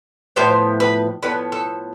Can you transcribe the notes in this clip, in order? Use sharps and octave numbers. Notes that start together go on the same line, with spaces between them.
A2 F3 B3 C5
B4
A2 F3 B3 B4
A4